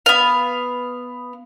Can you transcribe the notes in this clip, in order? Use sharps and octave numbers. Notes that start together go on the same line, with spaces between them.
B3 F5